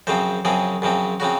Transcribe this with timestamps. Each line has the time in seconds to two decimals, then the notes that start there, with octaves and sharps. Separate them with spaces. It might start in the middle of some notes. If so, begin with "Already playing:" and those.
0.07 F#2 C#3 F3 C4 C5
0.45 F#2 C#3 F3 C4 G#4
0.82 F#2 C#3 F3 C4
1.20 C#3 F3 C4 F#4